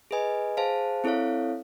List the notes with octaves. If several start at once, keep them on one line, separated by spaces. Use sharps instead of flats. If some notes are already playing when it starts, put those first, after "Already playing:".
G#4 B4 D#5 G#5
G#4 C5 F5 A5
C4 E4 A4 C#5 F5